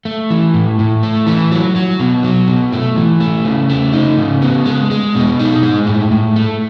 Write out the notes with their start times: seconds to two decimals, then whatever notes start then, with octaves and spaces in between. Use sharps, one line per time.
0.05 A3
0.30 E3
0.54 A2
0.79 A2
1.03 A3
1.27 E3
1.52 F#3
1.76 F#3
2.00 B2
2.23 F#3
2.48 B2
2.72 A3
2.96 E3
3.20 A3
3.45 C#3
3.70 A3
3.93 D#4
4.17 C#3
4.42 B3
4.66 G#3
4.91 G#3
5.15 B2
5.39 D#4
5.63 G#3
5.87 A2
6.11 A2
6.36 A3